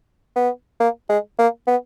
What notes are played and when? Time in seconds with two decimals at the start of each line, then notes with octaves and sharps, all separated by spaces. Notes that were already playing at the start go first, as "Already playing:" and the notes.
0.36 B3
0.80 A#3
1.09 G#3
1.38 A#3
1.67 B3